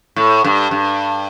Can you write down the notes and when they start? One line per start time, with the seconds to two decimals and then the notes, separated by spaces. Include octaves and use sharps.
0.16 A2
0.44 G2
0.71 G2